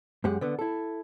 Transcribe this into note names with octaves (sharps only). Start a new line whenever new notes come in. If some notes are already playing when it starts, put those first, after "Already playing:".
F#2 G#3 G4 F#5
D3 B3
E4 A4